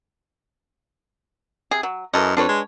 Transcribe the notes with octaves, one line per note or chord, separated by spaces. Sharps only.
C3 G#4
F#3
F#2 E3 A4 D#5
F2 D4 B4 C#5
G#3